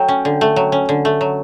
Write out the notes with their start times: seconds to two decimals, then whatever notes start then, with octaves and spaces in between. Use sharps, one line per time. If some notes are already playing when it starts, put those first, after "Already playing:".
Already playing: F#3 A3 G5
0.08 C#4
0.25 D3
0.41 A3
0.56 F#3
0.72 C#4
0.89 D3
1.05 A3
1.21 F#3